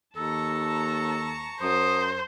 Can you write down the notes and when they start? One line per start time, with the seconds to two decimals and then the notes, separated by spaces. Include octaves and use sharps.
0.17 D#2 A4 A5 A#5 C#6
1.62 F#2 C5 D#6